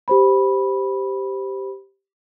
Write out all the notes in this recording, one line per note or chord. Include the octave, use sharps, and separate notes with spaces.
G4 C5 B5